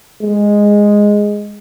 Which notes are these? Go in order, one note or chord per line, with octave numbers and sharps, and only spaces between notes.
G#3